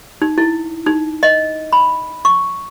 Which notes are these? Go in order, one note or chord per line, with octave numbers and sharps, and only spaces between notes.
D#4
E4
D#4
D#5
B5
C#6